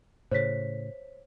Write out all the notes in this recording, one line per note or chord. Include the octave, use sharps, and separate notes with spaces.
A2 C#3 C5 C#5 B6